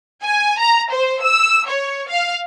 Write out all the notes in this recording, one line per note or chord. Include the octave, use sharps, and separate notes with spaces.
G#5
A#5
C5
E6
C#5
F5